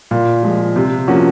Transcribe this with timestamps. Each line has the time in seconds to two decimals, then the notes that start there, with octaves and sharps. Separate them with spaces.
0.11 A#2
0.43 F3 G#3
0.76 C3
1.08 F3 A#3 C#4 F#4